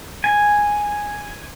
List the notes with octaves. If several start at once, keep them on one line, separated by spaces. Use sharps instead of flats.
G#5